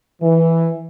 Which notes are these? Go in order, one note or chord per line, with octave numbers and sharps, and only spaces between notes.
E3